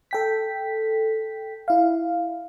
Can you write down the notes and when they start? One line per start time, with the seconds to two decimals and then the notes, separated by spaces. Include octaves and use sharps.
0.11 A4 G5 B6
1.68 E4 F5